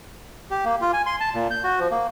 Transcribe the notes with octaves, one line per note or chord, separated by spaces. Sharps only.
G4
A#3
F4
G#5
C6
A5
A#2
G6
F#4
F3
A#3